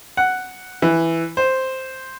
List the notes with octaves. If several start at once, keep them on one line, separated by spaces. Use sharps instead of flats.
F#5
E3
C5